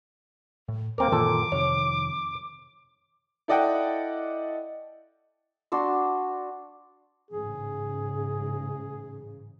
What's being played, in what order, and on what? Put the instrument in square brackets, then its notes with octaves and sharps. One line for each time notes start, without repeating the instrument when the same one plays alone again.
[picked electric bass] A2
[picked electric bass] D#1 [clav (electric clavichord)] A#3 C4 A#4 [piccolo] D6
[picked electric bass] F#2 D#3 E3 [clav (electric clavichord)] A#2 A4
[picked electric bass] F2 C3 D#3 [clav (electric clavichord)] C#5
[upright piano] E4 A4 D5 D#5 F#5 G5
[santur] D4 F#4 C6 E6
[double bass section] A1 G#2 C#3 [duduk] G#4